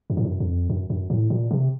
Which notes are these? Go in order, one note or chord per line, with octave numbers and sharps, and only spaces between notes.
F#2
A2
F#2
F2
F#2
F#2
A2
A#2
C3